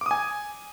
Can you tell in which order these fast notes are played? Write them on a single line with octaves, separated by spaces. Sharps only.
D6 D#6 G#5